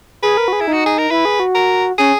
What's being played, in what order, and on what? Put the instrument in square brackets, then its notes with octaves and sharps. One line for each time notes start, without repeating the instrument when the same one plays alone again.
[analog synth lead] G#4 [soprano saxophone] B4
[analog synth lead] A#4
F#4
G#4
[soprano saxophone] E4
[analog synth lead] D#4
[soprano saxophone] F#4
G#4
A#4
[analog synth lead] E4 [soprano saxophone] B4
[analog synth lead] G#4
F#4
[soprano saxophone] A#4
[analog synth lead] C#4 [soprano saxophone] G#4